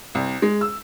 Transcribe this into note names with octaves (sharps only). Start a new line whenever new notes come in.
C2
G#3
E6